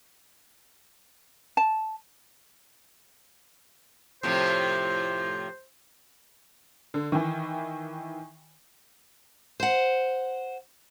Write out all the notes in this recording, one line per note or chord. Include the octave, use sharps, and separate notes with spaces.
A5
A2 C3 F3 C5
D3
D#3 E3
C5 F#5